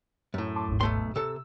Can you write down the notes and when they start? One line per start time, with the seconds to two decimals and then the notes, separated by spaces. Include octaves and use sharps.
0.34 F#2 A2
0.56 A5 C6 D6
0.68 G1 D2 G#2
0.81 B1 A3 C6
1.16 C3 A4 E6